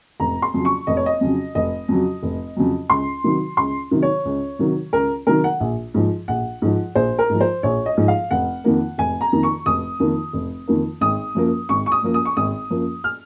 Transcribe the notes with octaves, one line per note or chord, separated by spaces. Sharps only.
F1 A#5
C6
F2 C#3 F#3
C#6
F1 D#5
C#5
D#5
F2 C#3 F#3
F1 D#5
F2 C#3 F#3
F1
F2 C#3 F#3
C#2 C6
C3 D#3 F#3
C#2 C6
C3 D#3 F#3
C#5
C#2
C3 D#3 F#3
C#2 A#4
C3 D#3 F#3 A#4
F#5
A#1
G#2 F3
A#1 F#5
G#2 F3
A#1 C5
A#4
G#2 F3
C5
A#1 C#5
D#5
G#2 F3
F5
F1 F#5
F2 D#3 A#3
F1 G#5
A#5
F2 D#3 A#3
C#6
F1 D#6
F2 D#3 A#3
F1
F2 D#3 A#3
G#1 D#6
F#2 F3 A#3
G#1 C#6
C#6
D#6
F#2 F3 A#3
D#6
C#6
G#1 D#6
F#2 F3 A#3
F6